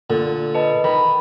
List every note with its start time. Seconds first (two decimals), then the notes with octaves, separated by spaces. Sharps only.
0.10 A#2 D3
0.54 B4 D#5 A5
0.84 D#3 B5